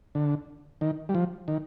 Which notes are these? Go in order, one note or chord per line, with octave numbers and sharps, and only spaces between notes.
D3
D#3
G3
F3
D#3